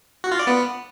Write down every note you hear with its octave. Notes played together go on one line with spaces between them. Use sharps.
F#4
F4
D5
B3